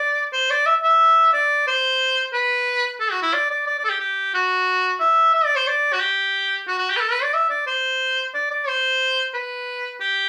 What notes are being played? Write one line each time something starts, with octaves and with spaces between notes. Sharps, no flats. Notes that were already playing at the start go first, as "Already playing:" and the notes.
Already playing: D5
C5
D5
E5
E5
D5
C5
B4
A4
F#4
E4
D5
D5
D5
D5
A4
G4
G4
F#4
E5
E5
D5
C5
D5
F#4
G4
F#4
F#4
G4
B4
A4
B4
D5
E5
D5
C5
D5
D5
C5
B4
G4